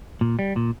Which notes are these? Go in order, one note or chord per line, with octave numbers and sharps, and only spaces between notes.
A#2
G3
A#2